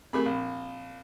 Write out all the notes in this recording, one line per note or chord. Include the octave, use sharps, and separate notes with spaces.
A3 C4 G4 G#4 A#4 B5
A#1